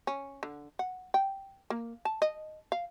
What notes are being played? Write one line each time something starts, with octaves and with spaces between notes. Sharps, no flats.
C#4
D3
F#5
G5
A#3
A5
D#5
F5